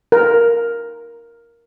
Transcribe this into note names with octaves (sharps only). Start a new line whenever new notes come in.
A#4